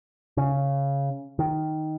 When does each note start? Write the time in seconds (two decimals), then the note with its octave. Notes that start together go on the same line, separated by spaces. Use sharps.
0.37 C#3
1.39 D#3